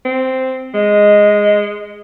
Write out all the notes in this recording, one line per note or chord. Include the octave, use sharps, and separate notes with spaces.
C4
G#3 D#5